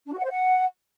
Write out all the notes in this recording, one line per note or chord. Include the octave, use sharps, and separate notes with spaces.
D4
F#4
F#5
C5
F#5